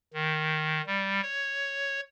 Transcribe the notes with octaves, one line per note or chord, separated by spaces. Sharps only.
D#3
G3
C#5